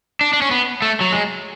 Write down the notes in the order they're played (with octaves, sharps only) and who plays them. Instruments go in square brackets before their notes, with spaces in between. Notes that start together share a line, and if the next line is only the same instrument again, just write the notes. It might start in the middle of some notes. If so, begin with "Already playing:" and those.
[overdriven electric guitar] D4
D4
C#4
B3
A3
F#3
G#3